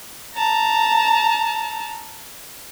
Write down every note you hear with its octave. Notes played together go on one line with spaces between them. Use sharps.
A5 A#5